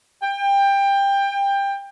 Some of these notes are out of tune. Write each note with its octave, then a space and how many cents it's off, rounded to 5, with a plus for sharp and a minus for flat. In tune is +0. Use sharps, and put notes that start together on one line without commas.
G5 +20